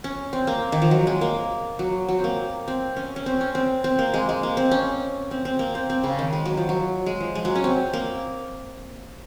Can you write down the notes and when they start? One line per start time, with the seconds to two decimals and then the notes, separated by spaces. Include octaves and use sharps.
0.04 C#4
0.33 C4
0.47 A#3
0.72 D#3
0.82 F3
0.91 F#3
1.07 G#3
1.21 A#3
1.79 F#3
2.09 F#3
2.19 A#3 C4
2.68 C4
2.97 C#4
3.16 C#4
3.26 C4
3.41 C#4
3.55 C4
3.84 C4
3.99 A#3
4.14 G#3
4.29 G#3
4.43 A#3
4.57 C4
4.71 C#4
5.31 C4
5.45 C4
5.59 A#3
5.75 C4
5.90 C4
6.03 C#3
6.19 D#3
6.33 G#3
6.46 F#3
6.58 F3
6.69 F#3
7.06 G#3
7.20 F3
7.35 G#3
7.45 F#3
7.55 C#4
7.64 C4
7.93 A#3